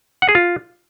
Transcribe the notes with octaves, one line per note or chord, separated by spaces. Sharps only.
F#5
G#4
F4